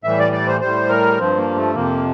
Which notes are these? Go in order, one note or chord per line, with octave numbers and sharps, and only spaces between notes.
A2 E3 G3 E5
D5
D5
C5
A2 G3 C5
A#4
G2 F3 C4
A#3
A3
F2 C3 F3 A#3